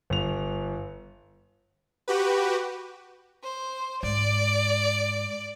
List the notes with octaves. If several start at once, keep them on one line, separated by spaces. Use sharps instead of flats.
G1 F7
F#4 G4 B4
C5
G#2 D5